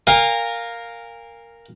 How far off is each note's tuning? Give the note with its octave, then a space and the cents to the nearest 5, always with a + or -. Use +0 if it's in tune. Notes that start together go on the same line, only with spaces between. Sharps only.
A#4 -5 F5 +5 G#5 -40